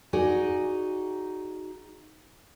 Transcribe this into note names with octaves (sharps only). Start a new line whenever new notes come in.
D#4 F#4 G#4 D5